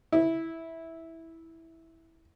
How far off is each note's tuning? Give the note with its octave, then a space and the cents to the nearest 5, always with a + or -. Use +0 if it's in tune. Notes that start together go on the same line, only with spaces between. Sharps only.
E4 -10